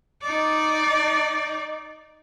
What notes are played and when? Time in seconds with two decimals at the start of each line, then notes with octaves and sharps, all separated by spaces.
0.22 D#4 D5